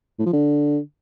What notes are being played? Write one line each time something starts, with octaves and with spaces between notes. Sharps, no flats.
A2
F3
D3